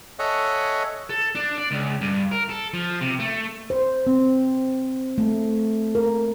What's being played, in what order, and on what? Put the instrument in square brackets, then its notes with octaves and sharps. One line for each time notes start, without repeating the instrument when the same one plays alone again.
[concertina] A4 C#5 D#5 E5 F#5 G#5
[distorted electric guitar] A4
D4
D5
C#2
G2
A#4
A4
F3
C3
A3
[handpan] C5
C4
A3
A#4